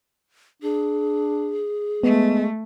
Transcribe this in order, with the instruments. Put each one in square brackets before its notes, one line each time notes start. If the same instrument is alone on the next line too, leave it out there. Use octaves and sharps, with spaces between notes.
[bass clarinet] D4 [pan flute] G#4
[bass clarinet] G#3 [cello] A3 [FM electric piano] B3